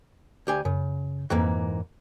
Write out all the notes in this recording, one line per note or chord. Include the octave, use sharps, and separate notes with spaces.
D2 G4 G#5
F#2 C#3
F2 G#2 E3 A#3